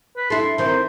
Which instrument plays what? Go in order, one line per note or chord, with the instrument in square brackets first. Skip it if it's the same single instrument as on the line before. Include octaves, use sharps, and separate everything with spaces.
[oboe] B4
[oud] A3 E4 [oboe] C6
[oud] D#3 E3 C4 [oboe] C5